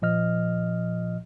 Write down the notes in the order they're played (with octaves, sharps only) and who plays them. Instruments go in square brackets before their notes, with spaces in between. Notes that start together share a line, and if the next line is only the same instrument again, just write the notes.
[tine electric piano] A#2 F3 D#5 F6